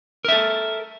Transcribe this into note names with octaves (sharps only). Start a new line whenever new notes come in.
A4 A#4 E5